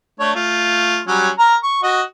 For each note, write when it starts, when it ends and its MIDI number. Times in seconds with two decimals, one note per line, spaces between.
0.20 0.32 57
0.20 0.32 62
0.20 0.32 73
0.35 1.01 57
0.35 1.01 65
1.08 1.29 54
1.08 1.29 55
1.08 1.29 61
1.38 1.55 70
1.38 1.55 82
1.63 1.82 85
1.83 2.02 66
1.83 2.02 75